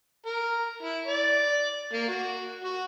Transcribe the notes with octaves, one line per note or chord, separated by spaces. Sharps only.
A#4
E4
D5
A#3
F#4
F#4